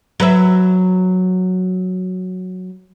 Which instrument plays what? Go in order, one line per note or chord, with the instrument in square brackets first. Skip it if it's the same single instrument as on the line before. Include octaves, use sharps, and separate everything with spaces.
[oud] F#3 B4 E5